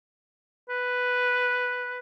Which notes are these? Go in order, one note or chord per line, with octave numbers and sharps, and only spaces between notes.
B4